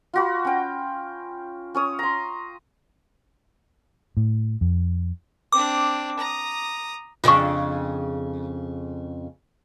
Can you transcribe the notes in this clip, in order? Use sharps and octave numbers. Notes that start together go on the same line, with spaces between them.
F4 F#4 B5
C#4 G5
C#4 C#5 D#6
A#5 C6
A2
F2
C4 D4 D6
A#5 D#6
F2 C#3 D4 F4 C#6